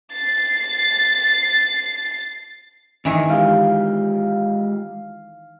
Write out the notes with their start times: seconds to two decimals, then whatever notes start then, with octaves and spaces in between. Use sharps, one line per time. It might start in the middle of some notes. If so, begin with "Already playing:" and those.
0.14 A6 C7
3.05 D#3 E3 C#4
3.30 G#3 F4 G4 F5